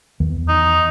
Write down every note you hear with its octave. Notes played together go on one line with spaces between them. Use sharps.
E2 D#3 E3
D#4